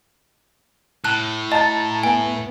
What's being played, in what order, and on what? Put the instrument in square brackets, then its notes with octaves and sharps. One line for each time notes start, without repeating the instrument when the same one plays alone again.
[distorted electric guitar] A2 [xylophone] A5 F#6
[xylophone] D#5 [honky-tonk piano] A5 A#5 A6
[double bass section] B3 [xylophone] G#5